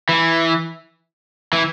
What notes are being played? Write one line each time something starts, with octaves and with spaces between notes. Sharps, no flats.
E3
E3